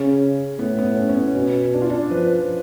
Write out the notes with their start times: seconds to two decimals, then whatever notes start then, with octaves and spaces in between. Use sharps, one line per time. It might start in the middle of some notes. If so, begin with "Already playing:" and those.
Already playing: C#3 C#4
0.58 A2 B3
0.79 B3
0.97 C#4
1.09 C#4
1.16 B3
1.35 B2 C#4
1.73 D4
1.81 F4
1.90 D4
2.11 F3 B4